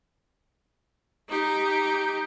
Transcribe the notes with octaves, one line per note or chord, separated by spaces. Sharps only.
D#4 G4